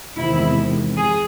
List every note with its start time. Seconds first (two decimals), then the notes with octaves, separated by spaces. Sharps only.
0.16 E2 C3 D#3 G#3 E4
0.97 G#4